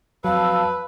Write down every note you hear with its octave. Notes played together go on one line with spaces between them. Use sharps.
F2 F#3 B4 F5 A5 E6